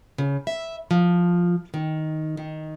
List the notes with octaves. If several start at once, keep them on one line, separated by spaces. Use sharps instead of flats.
C#3
E5
F3
D#3
D#3